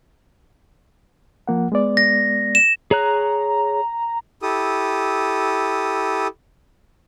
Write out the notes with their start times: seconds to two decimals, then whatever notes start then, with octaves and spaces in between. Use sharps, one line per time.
1.48 F3 A#3 F#5
1.72 G#3 B3 D5
1.97 A#6
2.55 E7
2.91 G#4 C#5 A#5 F#6
4.42 E4 G4 A4 D#6